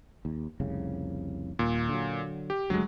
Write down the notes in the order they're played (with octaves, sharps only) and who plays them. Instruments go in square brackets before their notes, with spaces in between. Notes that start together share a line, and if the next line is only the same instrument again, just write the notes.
[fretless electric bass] D#2
F1 C2 C#3
[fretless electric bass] D#1 D#2 [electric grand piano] A#2
[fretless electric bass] D3 F#3
[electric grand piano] G4
[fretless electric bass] F#1 D2 [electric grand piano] F#3 G#3